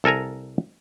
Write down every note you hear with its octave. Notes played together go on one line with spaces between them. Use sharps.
C2 A4 A#4 G#5 A#5